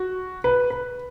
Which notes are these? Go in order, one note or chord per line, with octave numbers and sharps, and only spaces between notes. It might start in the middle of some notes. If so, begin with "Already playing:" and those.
Already playing: F#4
B4
B4